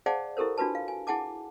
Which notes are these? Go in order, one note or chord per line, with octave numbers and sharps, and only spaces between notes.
G#4 C5 D5 F5 F#5 A5
E4 G4 A4 A#4 C5
D4 F4 F#4 B4 A5
F5
G#5
E4 G#4 F#5 G#5 A5 D6